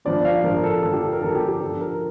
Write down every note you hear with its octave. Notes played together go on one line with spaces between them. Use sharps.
G2 D3 F3 D5
F5
G2 D3 F3 A#4
A4
G2 D3 F3 A4
G4
A4
A#4
G2 D3 F3 A4
G4
G4
G2 D3 F3 A4
A#4